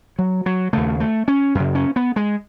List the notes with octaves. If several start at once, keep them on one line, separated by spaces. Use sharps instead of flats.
F#3
F#3
D#2 C#3 A3
A3
C#4
F#2 C#3
C#4
B3
G#3